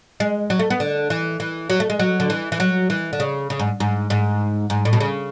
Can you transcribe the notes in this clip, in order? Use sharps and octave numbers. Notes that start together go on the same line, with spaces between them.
G#3
F#3
A3
B3
D3
E3
E3
F#3
A3
G#3
F#3
D3
E3
E3
F#3
E3
D3
C#3
C#3
G#2
G#2
G#2
G#2
A2
B2
C#3